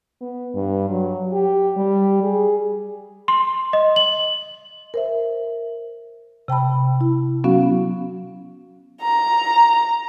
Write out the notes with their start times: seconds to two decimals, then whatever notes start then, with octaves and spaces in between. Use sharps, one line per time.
0.21 B3
0.55 G2
0.89 F#3
1.33 G4
1.77 G3
2.23 G#4
3.28 C6
3.73 D#5
3.96 F#7
4.94 A#4 C5 E5
6.48 C3 G5 A5 B5
7.01 E4
7.44 F#3 B3 C#4 F#4 F5
9.01 A#5